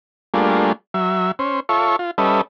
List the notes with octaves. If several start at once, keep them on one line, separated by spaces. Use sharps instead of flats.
G3 A3 A#3 D4 F4 G#4
F#3 E5
C#4 C5
F4 A4 C#5 E5 C#6
F4
G3 C#4 A4 B4 D#5 E5